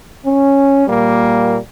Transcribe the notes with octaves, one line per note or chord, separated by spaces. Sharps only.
C#4
A#2 G3 A#3